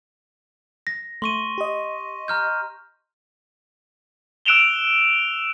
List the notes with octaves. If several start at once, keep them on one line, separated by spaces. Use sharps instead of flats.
A#6
A3 C6 C#6 D#7
G4 D#5
A#5 F6 G6
E6 F#6 D7 E7 F7 G7